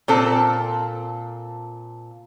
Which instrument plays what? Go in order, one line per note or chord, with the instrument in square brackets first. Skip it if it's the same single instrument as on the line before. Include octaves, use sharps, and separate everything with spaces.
[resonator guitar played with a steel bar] A#2 C4 A4